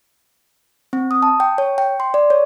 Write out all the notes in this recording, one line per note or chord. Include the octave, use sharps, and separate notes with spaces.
C4
D#6
A5
G5
C#5
G5
C6
D5
C#5